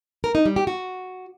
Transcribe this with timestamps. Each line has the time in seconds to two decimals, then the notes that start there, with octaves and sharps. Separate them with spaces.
0.24 A#4
0.35 D#4
0.46 G3
0.56 G4
0.67 F#4